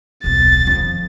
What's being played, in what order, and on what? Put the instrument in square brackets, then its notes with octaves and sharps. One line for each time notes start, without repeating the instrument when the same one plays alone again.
[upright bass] D#1 B1 [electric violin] A6
[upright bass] F2 D#3